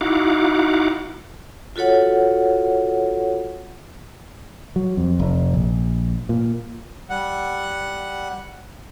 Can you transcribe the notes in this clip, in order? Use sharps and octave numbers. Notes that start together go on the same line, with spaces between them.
D#4 E4 F#4 F5 F#5 D6
F4 F#4 A4 C#5 F#5
F#3
F2
F1
A#1
A#2
G3 F#5